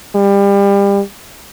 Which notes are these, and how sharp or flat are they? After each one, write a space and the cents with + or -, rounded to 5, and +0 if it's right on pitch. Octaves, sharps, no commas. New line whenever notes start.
G3 +30